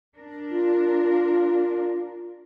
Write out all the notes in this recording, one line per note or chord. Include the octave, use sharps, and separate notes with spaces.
D4 A#4
F4